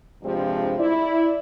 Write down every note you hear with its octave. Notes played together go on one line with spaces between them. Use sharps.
G2 C3 F3 G#3 C4 D4
E4 D5